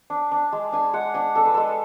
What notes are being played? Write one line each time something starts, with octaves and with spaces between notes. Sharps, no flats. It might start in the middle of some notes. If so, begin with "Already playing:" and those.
D4
D4
G#3
D4 G#5
G#3 F#5
D4 G#5
D4 A4
B4
G#3 A4